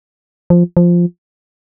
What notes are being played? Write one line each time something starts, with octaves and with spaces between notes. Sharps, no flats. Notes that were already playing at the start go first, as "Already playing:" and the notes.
F3
F3